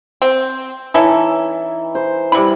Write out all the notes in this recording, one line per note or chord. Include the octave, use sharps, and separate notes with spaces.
C4
E3 C#4 D#4 E4 A4
C5
C3 G3 E4 B5